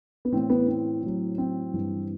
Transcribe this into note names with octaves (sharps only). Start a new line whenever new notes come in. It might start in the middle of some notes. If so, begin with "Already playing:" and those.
B3
A2 E3 C4
B3
C4
A2 F#3
C4
G2 E3